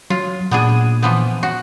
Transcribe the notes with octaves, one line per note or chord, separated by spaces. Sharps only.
F#3 F4
A#2 B3 D4 G#4
E3 F3 B3
F#4